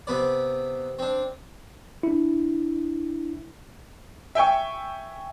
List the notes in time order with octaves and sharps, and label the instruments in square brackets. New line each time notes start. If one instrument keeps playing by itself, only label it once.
[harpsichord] C3 B3 B4 D5
C4 D4
[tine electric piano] D4 E4
[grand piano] E5 G5 G#5 C#6